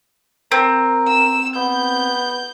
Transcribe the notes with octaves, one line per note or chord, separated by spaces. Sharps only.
C4 A#4
E6
B3 G6